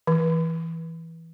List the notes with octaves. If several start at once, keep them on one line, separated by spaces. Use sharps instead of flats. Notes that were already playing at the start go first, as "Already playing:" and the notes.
E3